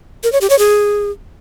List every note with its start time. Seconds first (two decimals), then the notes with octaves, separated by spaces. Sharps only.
0.24 A#4
0.32 C#5
0.41 G4
0.50 C#5
0.59 G#4